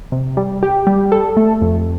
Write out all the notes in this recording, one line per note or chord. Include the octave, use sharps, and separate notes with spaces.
C3
G3
G4
G3
A4
A3
F2